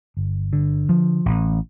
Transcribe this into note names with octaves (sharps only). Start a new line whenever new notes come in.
G1
D3
F3
A1